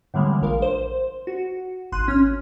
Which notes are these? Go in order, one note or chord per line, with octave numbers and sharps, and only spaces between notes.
A2 D3 E3 G3 G#3 A#3
A#1 A#4 F5
C5
F#4
G#1 C6 F#6 D#7
C#4 F6